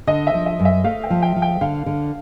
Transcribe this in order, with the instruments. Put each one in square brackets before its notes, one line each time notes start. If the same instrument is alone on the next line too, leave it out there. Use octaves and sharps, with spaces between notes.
[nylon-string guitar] D3 [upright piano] D#5
[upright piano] E5
[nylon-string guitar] F3
[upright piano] E5
[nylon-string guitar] F#2
[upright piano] E5
[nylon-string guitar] A3 [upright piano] F5
[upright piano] G5
[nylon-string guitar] F3
[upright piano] G5
[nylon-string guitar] F3
[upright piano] G5
[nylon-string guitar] D3 [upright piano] F5
[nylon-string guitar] D3